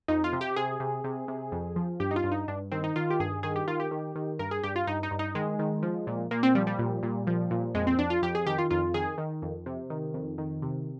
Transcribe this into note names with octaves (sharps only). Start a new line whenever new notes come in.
F2 D#4
F4
C3
G4
C3 G#4
C3
C3
C3
F2
F3
G2 G4
D#4
F4
G2
D#4
G2 D4
D#3 C4
D#4
D#3 F4
G4
G2 G#4
D#3 G#4
G4
D#3 F4
G4
D#3
D#3
G2 A#4
G#4
G2 G4
F4
G2 D#4
D#4
G2
D#4
D#3 G#3
D#3
F3
A#2
A#2 A#3
C4
F3 G3
G3
A#2
A#2
F3
A#2
F2 G#3
C4
F2 D4
F4
F2 G4
G#4
D#3 G4
F4
F2 F4
D#3 G#4
D#3
F2
C3
D#3
F2
D#3
C3